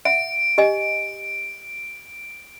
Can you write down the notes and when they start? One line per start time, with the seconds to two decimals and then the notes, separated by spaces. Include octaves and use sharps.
0.05 E5 F#5 D7
0.58 G4 D#5 G#5